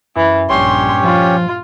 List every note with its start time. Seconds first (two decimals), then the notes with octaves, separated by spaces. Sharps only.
0.16 F#2 E3
0.50 A#1 G2 A#2 C#4 G4 C#5 C6
1.04 F3 F4